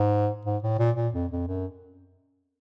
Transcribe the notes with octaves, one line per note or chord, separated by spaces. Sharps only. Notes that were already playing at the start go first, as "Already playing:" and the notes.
Already playing: G#2
G#2
A2
A#2
A#2
F2
F2
F#2